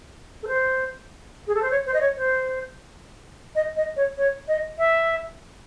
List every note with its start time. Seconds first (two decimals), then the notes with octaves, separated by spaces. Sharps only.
0.43 A4
0.48 C5
1.47 G#4
1.55 A4
1.62 C5
1.71 C#5
1.86 C5
1.94 D#5
2.01 C#5
2.17 C5
3.55 D#5
3.76 D#5
3.96 C#5
4.17 C#5
4.48 D#5
4.78 E5